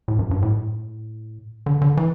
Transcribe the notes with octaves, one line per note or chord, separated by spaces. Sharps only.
A2
F#2
G2
A2
D3
D3
E3